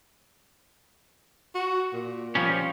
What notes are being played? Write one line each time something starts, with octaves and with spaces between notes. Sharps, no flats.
F#4
A#2
F3 G3 C#4